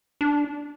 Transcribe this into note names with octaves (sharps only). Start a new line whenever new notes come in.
D4